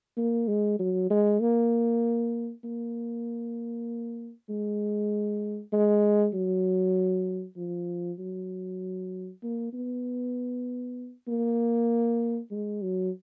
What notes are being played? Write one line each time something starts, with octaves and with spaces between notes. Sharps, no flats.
A#3
G#3
F#3
G#3
A#3
A#3
G#3
G#3
F#3
F3
F#3
A#3
B3
A#3
G#3
F#3